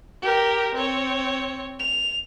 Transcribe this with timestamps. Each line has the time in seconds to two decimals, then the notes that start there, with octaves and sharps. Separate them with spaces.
0.22 G4 A#4
0.74 C4 C#5
1.79 F7